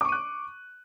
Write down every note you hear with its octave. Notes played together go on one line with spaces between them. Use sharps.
C#6 D6 F#6 D#7